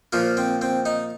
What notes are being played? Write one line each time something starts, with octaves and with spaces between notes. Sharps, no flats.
A#2 F3 A#3 F4
C4
C4
D#4